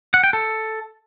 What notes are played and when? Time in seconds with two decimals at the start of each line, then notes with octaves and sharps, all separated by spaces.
0.14 F#5
0.24 G5
0.33 A4